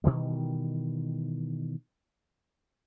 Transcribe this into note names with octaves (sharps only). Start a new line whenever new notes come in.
B2 D#3 E3 G3